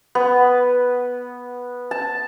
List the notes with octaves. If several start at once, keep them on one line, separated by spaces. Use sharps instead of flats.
B3
A5